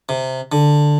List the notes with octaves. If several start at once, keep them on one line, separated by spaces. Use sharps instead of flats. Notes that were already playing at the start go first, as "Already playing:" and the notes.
C3
D3